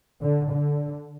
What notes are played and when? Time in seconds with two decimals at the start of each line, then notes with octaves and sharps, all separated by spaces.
0.21 D3
0.50 D3